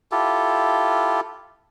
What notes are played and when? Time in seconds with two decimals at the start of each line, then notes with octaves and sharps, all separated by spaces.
0.12 E4 F4 G4 A4